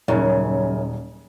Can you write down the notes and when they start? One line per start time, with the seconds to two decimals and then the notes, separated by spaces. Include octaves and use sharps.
0.08 D#1 F#2 C#3 C#4 D#4